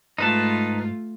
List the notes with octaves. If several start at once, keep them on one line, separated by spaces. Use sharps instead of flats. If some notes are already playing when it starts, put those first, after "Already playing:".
G#2 A3 D#4 F4 B4 A5